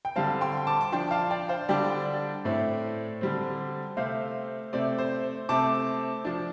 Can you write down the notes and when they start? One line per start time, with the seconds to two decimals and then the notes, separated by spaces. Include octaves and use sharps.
0.05 G5
0.16 D3 G3 C4 F5 A5
0.41 G5 C6
0.67 A5 D6
0.81 D6
0.92 F3 D4 G5 C6
1.11 F5 A5
1.30 D5 G5
1.49 C5 F5
1.69 D3 G3 D4 D5 G5
2.45 A2 A3 C4
3.21 D3 G3 C4
3.97 C3 A3 C4 C5 F5
4.73 C3 A3 C4 D5
4.98 C5
5.49 C3 A3 C4 A5 D6
6.25 F3 D4